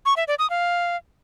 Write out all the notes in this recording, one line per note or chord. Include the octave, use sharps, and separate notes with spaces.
C#6
E5
D5
D#6
F5